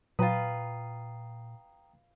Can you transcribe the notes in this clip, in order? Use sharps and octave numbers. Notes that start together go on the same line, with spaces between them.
A#2 F#3 F4 B4 G5 A#5 D#6